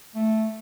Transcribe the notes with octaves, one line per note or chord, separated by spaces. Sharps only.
A3